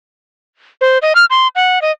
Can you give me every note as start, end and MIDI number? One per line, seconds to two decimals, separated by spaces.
0.81 0.98 72
1.02 1.13 75
1.15 1.25 89
1.30 1.48 84
1.56 1.81 78
1.82 1.91 75